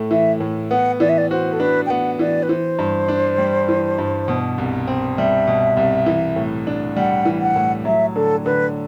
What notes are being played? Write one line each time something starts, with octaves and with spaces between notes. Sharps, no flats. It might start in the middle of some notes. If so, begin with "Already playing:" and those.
Already playing: A2 A3 E4
E3 E5
A2
B3 F#5
E3 D5
E5
D5
F#4 C5
A4
D4 B4
G5
B3 F#5
E3 D5
B4
E3 C5
G2
D4
G3
E3
G2
B2
C2
C4
G3 E5
B2
C2
E3
A2
D4
G3 F#5
E3
F#5
A2
F#3 E5
D3 A4
D3 B4